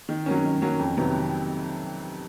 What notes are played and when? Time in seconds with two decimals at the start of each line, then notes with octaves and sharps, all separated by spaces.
0.09 D#3
0.26 F#3 A#3 C#4
0.44 D#3
0.62 F#3 A#3 C#4
0.79 F2
0.97 C3 D#3 F#3 B3